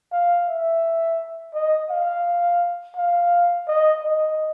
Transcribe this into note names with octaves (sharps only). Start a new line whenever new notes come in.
F5
E5
D#5
F5
F5
D#5
D#5